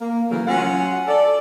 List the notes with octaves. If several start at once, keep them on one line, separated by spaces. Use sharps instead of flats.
A#3
C#3 E3 F#3 A3 A#3 A#4
F#3 C#4 F4 F#5
A4 D5